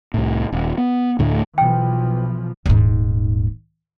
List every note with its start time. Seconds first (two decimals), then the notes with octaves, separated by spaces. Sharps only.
0.14 C2 A2
0.52 D#1
0.78 B3
1.19 D2 A2 D3 A3
1.58 B1 E3 F3 G5
2.66 D#1 G#2